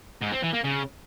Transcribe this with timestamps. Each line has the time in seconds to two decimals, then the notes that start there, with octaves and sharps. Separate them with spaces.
0.22 G#2
0.33 C4
0.43 E3
0.54 A#3
0.65 C#3